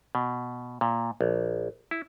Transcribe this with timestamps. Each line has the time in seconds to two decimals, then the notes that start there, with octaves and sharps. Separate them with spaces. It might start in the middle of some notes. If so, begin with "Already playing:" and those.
0.15 B2
0.81 A#2
1.21 A#1
1.91 E4